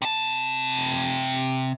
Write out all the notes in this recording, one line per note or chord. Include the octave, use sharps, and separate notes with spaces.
C3 A5